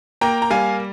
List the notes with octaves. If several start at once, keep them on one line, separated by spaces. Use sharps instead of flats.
A#3 G5 A#5
A#5
G3 F5 G#5